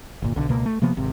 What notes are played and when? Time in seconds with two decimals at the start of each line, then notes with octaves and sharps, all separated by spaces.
0.22 G1 A#2
0.36 B1 D3
0.49 C#2 B2 A#3
0.66 A3
0.82 C3 F3 A#3 B3
0.97 G#1 C3